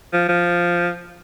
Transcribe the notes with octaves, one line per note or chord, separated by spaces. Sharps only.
F3
F3